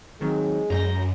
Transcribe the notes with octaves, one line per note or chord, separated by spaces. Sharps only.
D#3 F#3 G#3 C4
F#2 A#5 G6 A#6